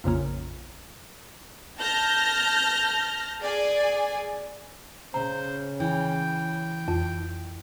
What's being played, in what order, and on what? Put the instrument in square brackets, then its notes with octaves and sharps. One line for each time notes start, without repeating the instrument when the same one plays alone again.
[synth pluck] A#1 F2 C#3 A#3
[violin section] A5 F6 G6 A#6
G#4 D5 G#5
[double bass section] C#3 [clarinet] C5 [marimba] A#5
[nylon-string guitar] E3 [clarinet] G5
[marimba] F2